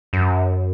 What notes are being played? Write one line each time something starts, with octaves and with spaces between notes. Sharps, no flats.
F#2